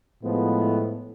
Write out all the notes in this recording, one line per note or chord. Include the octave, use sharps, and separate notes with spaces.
A2 F3 G#3 B3